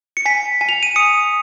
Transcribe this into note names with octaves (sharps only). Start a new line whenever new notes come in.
C#7
G#5 B6
G#5
F7
D#7
D#6 C#7